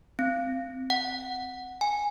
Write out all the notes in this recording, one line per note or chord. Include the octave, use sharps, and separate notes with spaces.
C4
F#5
G#5